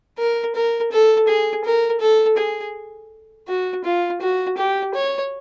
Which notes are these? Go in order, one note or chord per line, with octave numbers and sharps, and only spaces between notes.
A#4
A#4
A4
G#4
A#4
A4
G#4
F#4
F4
F#4
G4
C#5